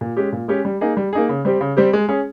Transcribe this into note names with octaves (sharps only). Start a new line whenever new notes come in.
A#2
G#3 C#4 G4
A#2
G#3 C#4 G4
G3
A#3 D#4 G#4
G3
A#3 D#4 G#4
C#3
G3 C4 G4
C#3
G3 C4 G4
G#3
C#4 G#4